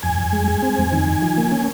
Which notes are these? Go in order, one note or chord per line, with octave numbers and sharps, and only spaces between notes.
F2 G#5
F2
G#3
G#3
C4
F2
D#3
D#3
F3
A#3
C#4